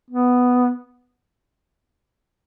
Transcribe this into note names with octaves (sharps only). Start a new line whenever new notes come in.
B3